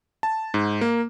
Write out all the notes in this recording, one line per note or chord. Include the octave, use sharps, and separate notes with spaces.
A5
G#2
A#3